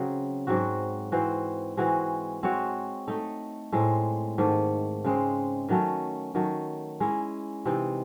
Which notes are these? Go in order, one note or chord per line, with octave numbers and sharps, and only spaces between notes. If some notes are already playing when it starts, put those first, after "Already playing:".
Already playing: C#3 F#3 C4
G#2 F#3 C4 F#4
E3 C4 F#4 C5
E3 G#3 C4 F#4
G#3 C4 F#4 C#5
A3 D#4 A4
A2 G#3 C4
G#2 D#3 A3
C#3 G#3 C4
D#3 F#3 A3 C#4
D#3 F#3 A3
G#3 C#4 E4
C3 E3 C4 D#4